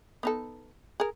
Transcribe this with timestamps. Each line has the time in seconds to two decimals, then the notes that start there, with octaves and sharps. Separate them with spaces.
0.23 B3 D#4 A4
1.00 G#4 A#4